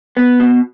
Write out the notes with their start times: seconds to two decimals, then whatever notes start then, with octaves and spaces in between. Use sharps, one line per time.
0.17 B3
0.40 B2